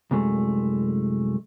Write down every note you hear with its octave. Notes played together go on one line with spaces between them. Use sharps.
C2 F#2 G#3 A3